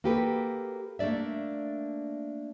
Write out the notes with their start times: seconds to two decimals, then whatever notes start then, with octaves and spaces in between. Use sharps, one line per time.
0.04 A#3 F#4 G4 A4 B4
0.99 A3 A#3 D4 D5 E5